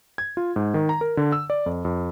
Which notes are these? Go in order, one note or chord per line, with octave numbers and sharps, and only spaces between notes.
G#6
F4
G#2
D#3
A#5
A#4
D3
E6
D5
F2
F2